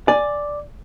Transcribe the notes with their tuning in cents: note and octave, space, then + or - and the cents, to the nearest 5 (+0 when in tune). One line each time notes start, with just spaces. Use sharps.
D5 +0 G#5 +0